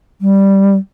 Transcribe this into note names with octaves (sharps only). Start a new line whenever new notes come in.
G3